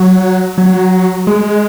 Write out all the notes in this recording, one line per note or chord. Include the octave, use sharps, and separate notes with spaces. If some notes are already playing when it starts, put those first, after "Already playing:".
Already playing: F#3
F#3
G#3